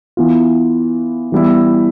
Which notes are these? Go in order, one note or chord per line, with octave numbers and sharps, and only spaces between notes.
E3 B3 F4
E3 G3 B3 E4